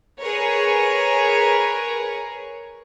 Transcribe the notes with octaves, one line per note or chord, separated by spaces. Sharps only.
G#4 A#4 B4 C#5